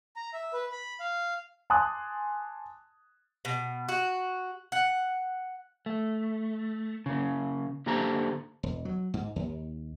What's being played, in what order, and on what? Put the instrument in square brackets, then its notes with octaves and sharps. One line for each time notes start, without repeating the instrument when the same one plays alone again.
[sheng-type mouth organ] A#5
E5
B4
B5
F5
[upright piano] G#5 A5 C6 D6 D#6 F#6
[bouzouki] B2
F#4
F#5
[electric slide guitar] A3
C#3 A#3
D3 A#3 G4 A4 C5 A#5
[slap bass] E1
F#3
G#2
D#2